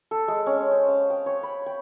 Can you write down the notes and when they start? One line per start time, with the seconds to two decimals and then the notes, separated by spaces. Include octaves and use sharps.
0.11 A4
0.28 G#3
0.46 C#4
0.71 C5
0.88 F5
1.10 G5
1.26 C#5
1.43 B5
1.66 G5